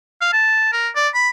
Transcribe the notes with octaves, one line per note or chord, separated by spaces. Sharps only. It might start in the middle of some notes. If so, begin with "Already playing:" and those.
F5
A5
A#4
D5
B5